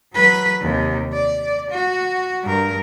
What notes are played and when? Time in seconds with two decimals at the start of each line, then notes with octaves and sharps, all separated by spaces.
0.14 F#3 B4
0.61 D#2 C3
1.12 D5
1.71 F#4
2.43 G2 A#4